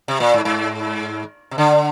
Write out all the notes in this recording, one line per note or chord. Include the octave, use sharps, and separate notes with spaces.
C3
A#2
G#2
G#2
C3
D3